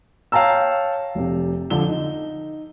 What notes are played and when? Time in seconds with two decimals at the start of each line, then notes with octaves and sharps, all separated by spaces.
0.32 C#5 F5 G5 A5 A#5 E6
1.15 F1 C3
1.70 D3 F3 G7
1.88 D#4